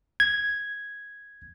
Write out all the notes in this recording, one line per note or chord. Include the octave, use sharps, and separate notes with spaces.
G#6